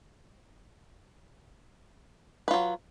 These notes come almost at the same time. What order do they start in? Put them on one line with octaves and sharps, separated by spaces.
B4 F4 F#3